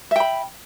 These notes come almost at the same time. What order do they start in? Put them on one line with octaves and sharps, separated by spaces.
E5 G5 B5